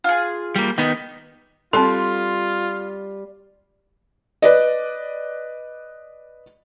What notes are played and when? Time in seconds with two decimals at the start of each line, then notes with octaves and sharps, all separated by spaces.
0.04 F4 G#4
0.56 G3 A#3
0.78 D#3 B3 D#4
1.73 G3 C4 F4 A4 C6
4.42 B4 D5 D#5